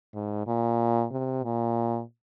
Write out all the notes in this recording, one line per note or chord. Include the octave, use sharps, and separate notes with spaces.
G#2
A#2
C3
A#2